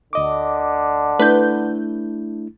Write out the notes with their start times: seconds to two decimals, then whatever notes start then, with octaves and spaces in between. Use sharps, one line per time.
0.13 D2 D3 D#5 D6
1.19 A3 D4 E4 B4 G6